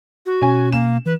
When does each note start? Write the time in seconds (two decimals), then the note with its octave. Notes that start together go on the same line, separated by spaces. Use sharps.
0.26 F#4
0.42 B2 C#4 G#5
0.72 A#3 E7
1.06 E3 B4